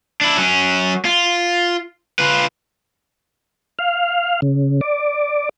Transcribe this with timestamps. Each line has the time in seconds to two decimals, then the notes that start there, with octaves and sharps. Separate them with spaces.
0.21 D4 E4
0.37 F#3 C#4
1.05 F4
2.19 F4 B4
3.79 F5
4.42 C#3
4.81 D5